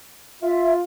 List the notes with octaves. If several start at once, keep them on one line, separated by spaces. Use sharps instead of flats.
F4 E5